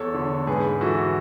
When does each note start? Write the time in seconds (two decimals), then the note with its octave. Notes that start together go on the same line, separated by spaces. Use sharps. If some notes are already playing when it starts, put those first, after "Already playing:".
Already playing: E2 A4 C#5
0.14 D3
0.47 G#2 G#4 B4
0.81 E3 F#4 A4